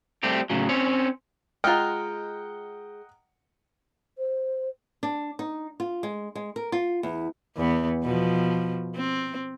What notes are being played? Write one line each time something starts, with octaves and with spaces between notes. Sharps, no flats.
G3 A3 C4 G4
A2 C#3 F#3
C4 C#4 C#5
G#3 F4 D#5 F#5 G5 A#5 F6
C5
D4
D#4
F4
G#3
G#3
A#4
F4
E2
E2 B3
B2 F3
C4